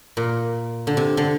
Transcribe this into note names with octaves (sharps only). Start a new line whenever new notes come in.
A#2
D3
C3
D3